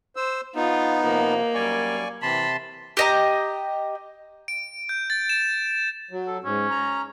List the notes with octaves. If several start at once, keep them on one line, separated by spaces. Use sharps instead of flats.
C5 E6
B3 D#4 F4
C3 F3 A#3
F#2 G3 D5 G#5 C#6
C3 E3 A5 B5 C6
G4 D#5 A#5
D7
G6
A6
E7
F#3
A4
G#2 C#4
A#5